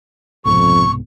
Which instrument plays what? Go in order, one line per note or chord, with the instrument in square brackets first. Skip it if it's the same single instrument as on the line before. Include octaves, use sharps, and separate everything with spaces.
[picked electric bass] C2 G#2 B2 [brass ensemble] F2 [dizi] C#6